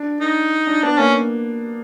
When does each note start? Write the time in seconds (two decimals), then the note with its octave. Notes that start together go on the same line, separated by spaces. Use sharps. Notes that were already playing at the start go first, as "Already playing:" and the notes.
Already playing: D4
0.20 D#4
0.67 D4
0.83 B3 D4
0.98 A#3 C#4